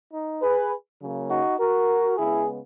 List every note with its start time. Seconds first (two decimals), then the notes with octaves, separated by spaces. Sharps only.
0.12 D#4
0.42 G#4 B4
1.00 C#3 F#3 A#3
1.30 D#4 F#4
1.59 F#4 A#4
2.17 C#3 G#3 B3 E4 G#4